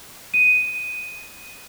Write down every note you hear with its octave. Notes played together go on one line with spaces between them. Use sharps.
D#7